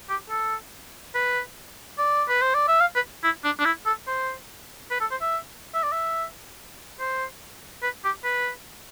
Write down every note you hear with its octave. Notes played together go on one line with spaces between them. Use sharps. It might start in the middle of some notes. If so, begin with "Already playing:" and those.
G4
A4
B4
D5
B4
C5
D5
E5
F5
B4
E4
D4
D4
E4
A4
C5
B4
A4
C5
E5
E5
D5
E5
C5
B4
G4
B4